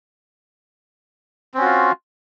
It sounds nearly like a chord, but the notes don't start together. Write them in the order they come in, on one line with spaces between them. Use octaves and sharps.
C4 C#4 F#4 F4